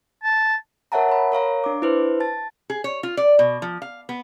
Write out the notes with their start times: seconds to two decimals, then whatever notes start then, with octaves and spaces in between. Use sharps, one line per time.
0.23 A5
0.92 A#4 C#5 E5 F#5 A5 A#5
1.09 C#5 B5
1.32 A#4 C#5 F5 A#5
1.64 D4 D6
1.82 E4 B4 C5
2.20 A5 A6
2.70 G#4
2.84 C#5
3.03 F4
3.17 D5
3.39 B2
3.62 F3
3.82 F5
4.09 B3